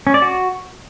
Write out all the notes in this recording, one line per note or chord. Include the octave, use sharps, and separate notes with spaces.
C#4
D5
F#4